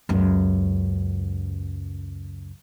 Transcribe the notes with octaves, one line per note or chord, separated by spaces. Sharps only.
C#2 F#2